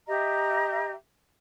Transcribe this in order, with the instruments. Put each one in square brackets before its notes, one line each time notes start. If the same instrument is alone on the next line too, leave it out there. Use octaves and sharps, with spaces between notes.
[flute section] G4 D#5 E5 A#5